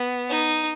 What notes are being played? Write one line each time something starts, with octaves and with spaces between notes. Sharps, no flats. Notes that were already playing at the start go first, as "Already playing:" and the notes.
Already playing: B3
D#4